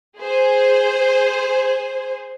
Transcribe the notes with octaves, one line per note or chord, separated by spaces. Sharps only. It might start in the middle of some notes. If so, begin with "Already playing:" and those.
G#4 C5